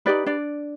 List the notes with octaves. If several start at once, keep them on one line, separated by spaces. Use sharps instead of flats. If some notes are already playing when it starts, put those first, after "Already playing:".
D4 D#4 G4 B4 D5
D4 D5